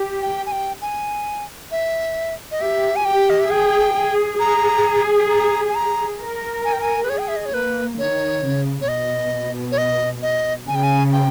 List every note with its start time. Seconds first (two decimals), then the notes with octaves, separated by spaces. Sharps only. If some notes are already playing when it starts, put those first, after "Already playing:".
Already playing: G4
0.21 G5
0.46 G#5
0.52 G5
0.82 G#5
1.71 E5
2.51 D#5
2.61 G4 E5
2.96 G#5
3.05 G4 G5
3.30 D#5
3.40 E5
3.51 G#4 G5
3.96 G#4
4.40 G#4 A#5
5.29 A#5
5.69 G#5
5.75 A#5
6.20 A#4
6.65 G#5
6.73 G5
6.81 G#5
7.03 B4
7.09 G#4 C#5
7.18 G5
7.28 E5
7.36 D#5
7.46 C#5
7.54 A#3 B4
7.99 D#3 C#5
8.43 C#3
8.81 C#5
8.88 B2 D#5
9.72 C#5
9.78 D#5
10.22 D#5
10.67 C#3 G#5
10.75 G5
10.83 G#5
11.12 G5